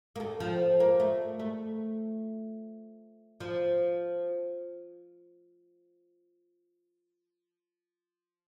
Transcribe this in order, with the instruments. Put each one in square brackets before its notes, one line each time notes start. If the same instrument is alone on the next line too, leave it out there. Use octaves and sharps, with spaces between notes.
[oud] A#3
A3
F3
A#3
A3
A3
F3